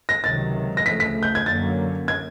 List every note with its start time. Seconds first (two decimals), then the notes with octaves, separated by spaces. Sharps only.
0.09 A#6
0.24 C#2 C3 D#3 F#3 A6
0.77 A#6
0.86 D2 C#3 F3 A3 B6
1.00 B6
1.23 G6
1.35 G#6
1.46 F#2 D3 F#3 A#3 C#4 A6
2.08 G#6